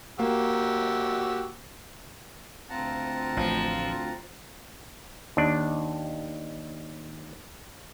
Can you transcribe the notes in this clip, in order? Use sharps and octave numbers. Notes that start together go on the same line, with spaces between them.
A#3 F#4 G4 E6
D2 C4 F4 F#5 A5 A#5
A1 F3
D#2 D4